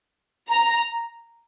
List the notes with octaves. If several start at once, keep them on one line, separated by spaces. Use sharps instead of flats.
A#5